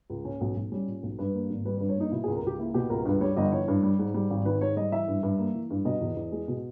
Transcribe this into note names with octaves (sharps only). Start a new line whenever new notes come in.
C#2
A#2 C#4
B1
B1
G3 C#4
A#2
B1
G2 B4
A#3
G#1
G3 B4
G2 B4
C#5
A#3 D#4
B2 E4
G#4
C#2
A#4
C#2 G4
A#3 E4
B2 G4
C#2 A#4
G2 B4
G3 C#5
G1 D#5
E3 C#5
G2
G3
G#2
G3
G#1
D#3 B4
G#2 C#5
G3 D#5
E3 E5
G2
G2
A#3
E3
G2
B2 D#5
E2
E2
G#3
B2